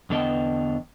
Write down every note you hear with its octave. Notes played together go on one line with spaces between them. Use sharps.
E2 D3 B3 D#5 G5 A5